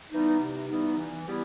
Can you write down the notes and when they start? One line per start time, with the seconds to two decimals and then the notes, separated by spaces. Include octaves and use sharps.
0.09 E3 G3 B3 D#4
0.39 C3
0.68 E3 G3 B3 D#4
0.97 E3
1.26 G3 B3 E4 G4